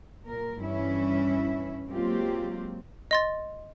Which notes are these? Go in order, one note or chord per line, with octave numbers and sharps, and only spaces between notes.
A#2 A#4
G2 E3 C#4 E4 E5
F#3 G#3 A#3 C4 F4 G4
D#5 C6 A6